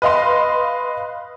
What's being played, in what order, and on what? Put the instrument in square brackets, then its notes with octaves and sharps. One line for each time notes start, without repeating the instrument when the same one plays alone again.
[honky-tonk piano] B4 D#5 F5 C6